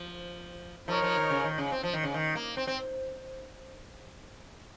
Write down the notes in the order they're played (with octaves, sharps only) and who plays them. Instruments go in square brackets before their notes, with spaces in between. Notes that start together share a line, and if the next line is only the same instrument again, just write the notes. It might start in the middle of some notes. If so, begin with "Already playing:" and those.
Already playing: [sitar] F3
[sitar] F3 [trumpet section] D#4 A#4 C#5
[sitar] F3
D#3
C#3
D#3
C#3
C4
F3
D#3
C#3
D#3
A#3
C4
C4